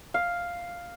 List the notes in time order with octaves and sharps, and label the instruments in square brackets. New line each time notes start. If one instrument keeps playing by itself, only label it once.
[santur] F5